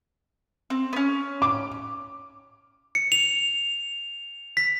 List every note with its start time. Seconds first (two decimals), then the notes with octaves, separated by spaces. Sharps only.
0.70 C4
0.93 B3 C#4
1.42 D6
2.95 C#7
3.12 F7
4.57 B6